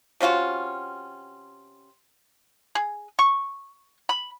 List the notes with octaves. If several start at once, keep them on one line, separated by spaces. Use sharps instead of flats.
C3 C#4 F4 F#4
G#4
C#6
B5